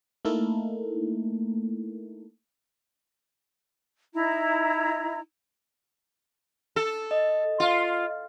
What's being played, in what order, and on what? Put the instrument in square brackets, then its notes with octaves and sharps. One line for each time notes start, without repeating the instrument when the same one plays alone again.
[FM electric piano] A3 A#3 D#4 E4 A4 A#4
[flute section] D#4 E4 A#5
[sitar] A4
[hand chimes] D#5
[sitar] F4